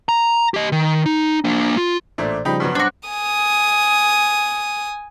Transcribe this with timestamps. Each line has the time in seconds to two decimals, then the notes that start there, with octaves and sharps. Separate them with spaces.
0.09 A#5
0.54 G4 D#5
0.72 D#3
1.06 D#4
1.44 A#3 D4
1.77 F4
2.18 A1 A#2 A3 D4 C5 D5
2.45 C#3 F3 G3 D#4 G5 B5
2.60 G2 B2 F#3
2.75 D4 F#4 C5
3.09 G#5 D#6